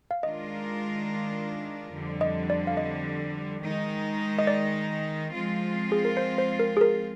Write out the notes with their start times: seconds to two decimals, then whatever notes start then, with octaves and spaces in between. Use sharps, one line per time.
0.11 F5
0.23 D#3 G#3 D4 F4 A#4 D#5
1.92 F2 D3 G3
2.21 D#5
2.50 D5
2.67 F5
2.77 D#5
3.62 D#3 G#3 D#4
4.39 D#5
4.47 D5
5.32 F3 G#3 C4 F4
5.92 G#4
6.05 A#4
6.17 C5
6.38 C5
6.59 A#4
6.77 G#4
6.81 A#4